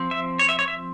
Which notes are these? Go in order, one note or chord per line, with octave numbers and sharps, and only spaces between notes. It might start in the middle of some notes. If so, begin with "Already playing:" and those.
Already playing: F3 C4
E5
C#5
E5
C#5
E5